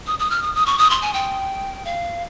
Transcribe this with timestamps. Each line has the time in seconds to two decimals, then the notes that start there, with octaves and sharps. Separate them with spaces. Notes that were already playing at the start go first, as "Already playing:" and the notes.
0.07 D#6
0.19 D#6
0.30 F6
0.42 D#6
0.55 D#6
0.66 C#6
0.78 D#6
0.90 C6
1.02 G#5
1.14 G5
1.85 F5